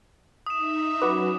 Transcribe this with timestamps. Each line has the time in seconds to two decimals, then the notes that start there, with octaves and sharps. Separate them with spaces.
0.46 D#4 E5 D#6 E7
1.02 F#3 C#4 F#4 B4 D6